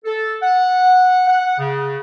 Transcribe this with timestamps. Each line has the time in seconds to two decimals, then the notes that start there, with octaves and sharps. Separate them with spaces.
0.05 A4
0.42 F#5
1.27 F#5
1.59 C#3